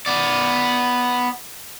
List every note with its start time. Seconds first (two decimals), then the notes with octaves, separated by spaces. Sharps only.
0.06 B3 D5